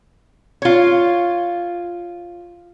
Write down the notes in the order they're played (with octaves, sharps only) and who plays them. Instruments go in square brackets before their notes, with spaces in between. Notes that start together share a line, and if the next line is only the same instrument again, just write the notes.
[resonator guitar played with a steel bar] F4 C#5